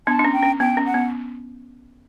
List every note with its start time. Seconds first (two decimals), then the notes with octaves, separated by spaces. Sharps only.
0.07 B3 D4 A5
0.19 D4
0.25 C#4
0.33 G5
0.42 C#4
0.60 B3 G5
0.77 C#4
0.86 F#5
0.94 B3